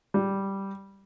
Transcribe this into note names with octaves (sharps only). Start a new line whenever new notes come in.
G3